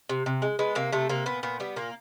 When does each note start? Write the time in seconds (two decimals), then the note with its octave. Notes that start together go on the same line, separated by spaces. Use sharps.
0.09 C3
0.26 C3
0.42 G#3
0.59 G#3 B3
0.75 C3 A#3
0.92 C3 A3
1.09 C3 A#3
1.26 A#2 B3
1.43 A#2 B3
1.60 G3 B3
1.76 A#2 A#3